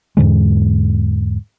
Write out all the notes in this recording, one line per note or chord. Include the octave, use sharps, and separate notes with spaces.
E2 G#2 D3 G#3